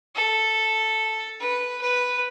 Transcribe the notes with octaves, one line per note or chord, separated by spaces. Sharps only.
A4
B4
B4